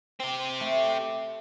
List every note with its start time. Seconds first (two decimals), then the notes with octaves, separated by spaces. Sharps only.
0.20 C4 G4
0.60 A3